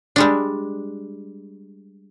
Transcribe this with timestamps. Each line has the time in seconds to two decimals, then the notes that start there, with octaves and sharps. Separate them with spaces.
0.16 G3 G#3 D4